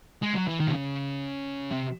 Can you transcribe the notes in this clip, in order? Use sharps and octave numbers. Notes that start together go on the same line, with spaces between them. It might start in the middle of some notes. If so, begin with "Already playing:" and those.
G#3
F#3
E3
D#3
C3
C#3
C3